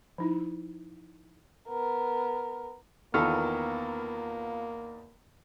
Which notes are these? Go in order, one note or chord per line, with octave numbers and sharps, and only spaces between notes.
F3 D#4 E4
B3 A#4
E2 D#3 A#3 B3 F4 A4 C#6 F6